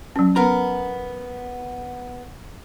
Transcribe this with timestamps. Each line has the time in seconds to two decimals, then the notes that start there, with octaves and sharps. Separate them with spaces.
0.16 F#3 C#4
0.36 B3 A#4 A#5